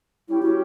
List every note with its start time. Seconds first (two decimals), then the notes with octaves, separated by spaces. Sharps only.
0.29 G3 C#4 E4 G4 C#5 G5
0.42 F#4